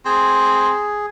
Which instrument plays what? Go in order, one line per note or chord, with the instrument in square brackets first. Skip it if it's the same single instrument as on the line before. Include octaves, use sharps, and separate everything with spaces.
[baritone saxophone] C4 [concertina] G#4